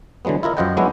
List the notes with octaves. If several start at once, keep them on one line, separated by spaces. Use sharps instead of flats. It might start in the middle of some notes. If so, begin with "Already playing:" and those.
D3 E3 F#3 G#3 B3
E4 F4 A#4 D#5
F#2 F3 C5 D#5 F#5 G5
F#3 G#3 B3 D4 E4 F#4